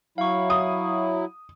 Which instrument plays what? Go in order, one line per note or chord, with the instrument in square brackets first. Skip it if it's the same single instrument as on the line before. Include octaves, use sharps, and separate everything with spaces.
[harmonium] F#3 E4 [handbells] F5 C#6
[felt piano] D#6